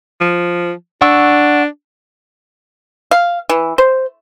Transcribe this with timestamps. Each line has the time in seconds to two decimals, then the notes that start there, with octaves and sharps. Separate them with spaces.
0.21 F3
1.02 D4 F#5 C#6 E6
3.11 F5
3.49 E3
3.78 C5